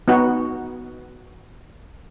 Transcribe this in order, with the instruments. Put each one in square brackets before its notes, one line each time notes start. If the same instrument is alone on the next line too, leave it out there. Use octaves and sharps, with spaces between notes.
[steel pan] B3 D#4 F#4